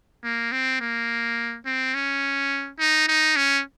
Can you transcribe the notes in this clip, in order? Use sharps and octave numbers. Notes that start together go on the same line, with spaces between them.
A#3
C4
A#3
C4
C#4
D#4
D#4
C#4